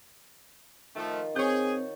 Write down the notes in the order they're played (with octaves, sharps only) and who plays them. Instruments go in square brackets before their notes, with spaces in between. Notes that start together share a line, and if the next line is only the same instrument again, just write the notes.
[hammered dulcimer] D#3 F4 [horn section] F3 A3
[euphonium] C4 [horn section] G#4 [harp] C#5 G6